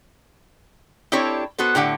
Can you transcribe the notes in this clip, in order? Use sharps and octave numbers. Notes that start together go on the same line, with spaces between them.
C4 D4 E4 G4 A4 C#5
B3 F#4 A4 C5
A2 D3 G4 F#5